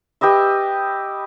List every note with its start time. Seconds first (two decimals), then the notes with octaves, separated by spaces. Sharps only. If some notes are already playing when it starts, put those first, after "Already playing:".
0.21 G4 B4 D#5 E5